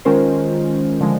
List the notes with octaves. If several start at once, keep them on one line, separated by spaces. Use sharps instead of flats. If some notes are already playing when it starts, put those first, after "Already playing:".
D#3 G#3 C#4 F4 A#4 C5
D3 F3 G#3